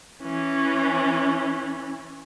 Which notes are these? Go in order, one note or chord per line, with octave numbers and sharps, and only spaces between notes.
E3 C#4